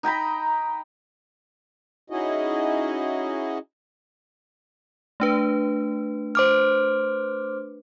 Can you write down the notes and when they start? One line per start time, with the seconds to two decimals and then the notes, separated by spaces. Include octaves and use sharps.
0.03 D#4 G5 A#5 B5
2.10 C#4 D#4 E4 F#4 G#4 D#5
5.20 A3 D4 B4
6.35 C5 D6 F6